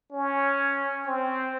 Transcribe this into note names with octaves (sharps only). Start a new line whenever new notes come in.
C#4
C4